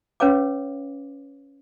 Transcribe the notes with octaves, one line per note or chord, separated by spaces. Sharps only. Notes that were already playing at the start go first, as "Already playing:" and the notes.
C#4 B4 C#5 F5 D6